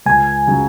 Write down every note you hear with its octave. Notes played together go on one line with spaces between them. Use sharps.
C#2 G#5
C#3 F#3